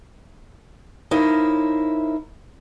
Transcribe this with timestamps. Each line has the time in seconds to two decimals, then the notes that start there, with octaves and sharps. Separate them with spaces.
1.11 D#4 E4 A#4 C5 C#5 F5